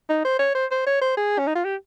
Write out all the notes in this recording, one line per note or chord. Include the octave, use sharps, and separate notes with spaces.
D#4
C5
C#5
C5
C5
C#5
C5
G#4
C#4
D#4
F4
G4